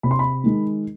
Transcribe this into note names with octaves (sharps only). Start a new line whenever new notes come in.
C3 B5
C6
B5
D#3 G#3